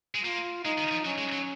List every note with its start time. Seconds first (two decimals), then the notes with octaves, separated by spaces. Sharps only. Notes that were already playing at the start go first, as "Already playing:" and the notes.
0.15 G#3
0.24 A#3 F4
0.65 G#3 D#4
0.78 D#3
0.91 F3
1.05 F#3 C#4
1.18 G#3
1.32 F#3